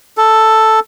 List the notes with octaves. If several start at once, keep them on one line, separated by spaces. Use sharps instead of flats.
A4